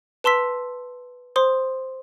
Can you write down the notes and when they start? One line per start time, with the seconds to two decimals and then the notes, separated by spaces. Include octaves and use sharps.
0.24 B4 A5 C6 E6 B6
1.36 C5 C6 D#6